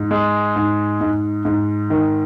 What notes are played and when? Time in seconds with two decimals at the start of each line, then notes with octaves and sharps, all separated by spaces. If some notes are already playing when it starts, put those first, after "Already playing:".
Already playing: G#2
0.11 G#3
0.56 G#2
1.01 G#2
1.45 G#2
1.90 D#3